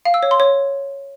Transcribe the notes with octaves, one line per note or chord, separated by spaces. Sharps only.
F5
E6
C#5
C6
C#5